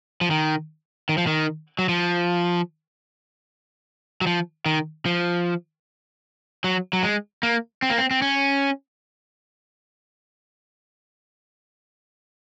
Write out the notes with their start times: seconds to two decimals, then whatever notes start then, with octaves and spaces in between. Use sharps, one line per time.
0.21 F3
0.31 D#3
1.09 D#3
1.18 F3
1.27 D#3
1.79 F#3
1.89 F3
4.21 F#3
4.27 F3
4.66 D#3
5.06 F3
6.64 F#3
6.93 F#3
7.03 G#3
7.43 A#3
7.82 C4
7.90 A#3
7.98 C4
8.11 C4
8.22 C#4